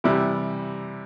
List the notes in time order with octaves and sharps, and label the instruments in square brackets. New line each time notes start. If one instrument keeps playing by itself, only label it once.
[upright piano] C3 E3 G3 E4